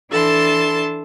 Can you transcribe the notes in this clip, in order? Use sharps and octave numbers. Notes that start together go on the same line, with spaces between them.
E3 D4 A4 A5 C6